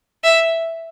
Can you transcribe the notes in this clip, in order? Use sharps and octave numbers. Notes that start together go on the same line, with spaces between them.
E5